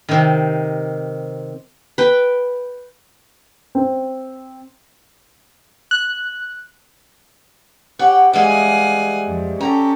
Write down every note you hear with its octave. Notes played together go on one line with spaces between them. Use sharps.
C3 D#3
B4 G5
C4
F#6
G4 C#5 F#5
E3 G3 G#3 F5 F#5 G#5
F2
C#4 G4 A4 A#5